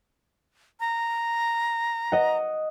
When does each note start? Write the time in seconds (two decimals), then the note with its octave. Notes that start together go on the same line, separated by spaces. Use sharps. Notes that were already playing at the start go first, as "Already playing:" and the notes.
0.80 A#5
2.12 D#5 F#5